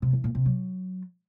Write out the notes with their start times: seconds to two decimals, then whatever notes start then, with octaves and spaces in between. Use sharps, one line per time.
0.02 C3
0.13 E3
0.24 A#2
0.35 C3
0.46 F#3